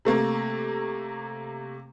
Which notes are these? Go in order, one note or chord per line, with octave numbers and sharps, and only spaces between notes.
C3 A3 A#3